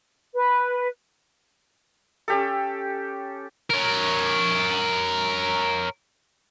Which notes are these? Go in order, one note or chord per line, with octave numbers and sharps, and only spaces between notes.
B4
C#4 G4 A4
A#4 C#5